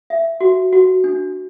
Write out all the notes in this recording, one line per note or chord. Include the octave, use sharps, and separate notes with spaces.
E5
F#4
F#4
D4